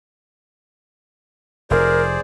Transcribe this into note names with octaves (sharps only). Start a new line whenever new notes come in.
F1 G#4 A#4 C5 D5